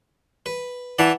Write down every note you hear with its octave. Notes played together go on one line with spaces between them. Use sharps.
B4
E3 D5 F#5 A5